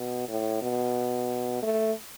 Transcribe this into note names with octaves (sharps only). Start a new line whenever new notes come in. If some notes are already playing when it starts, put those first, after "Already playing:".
Already playing: B2
A2
B2
A3